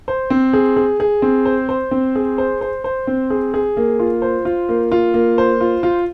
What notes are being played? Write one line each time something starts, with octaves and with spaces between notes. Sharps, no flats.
C5
C4
G#4
G#4
G#4
C4
C5
C5
C4
G#4
C5
C5
C5
C4
G#4
G#4
A#3
F4
C5
F4
A#3
F4
A#3
C5
F4
F4